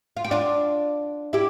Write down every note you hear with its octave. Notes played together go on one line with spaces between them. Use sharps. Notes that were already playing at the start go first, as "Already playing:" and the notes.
F4
G4
D4 F4
E4 G4